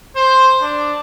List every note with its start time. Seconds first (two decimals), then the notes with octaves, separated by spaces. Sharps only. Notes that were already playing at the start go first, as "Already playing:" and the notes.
0.16 C5
0.62 D4